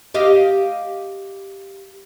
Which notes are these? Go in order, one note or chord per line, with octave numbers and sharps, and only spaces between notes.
G4 D#5 F5